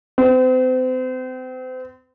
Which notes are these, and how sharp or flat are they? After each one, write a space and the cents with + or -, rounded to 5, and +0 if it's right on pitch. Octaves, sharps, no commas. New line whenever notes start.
C4 -35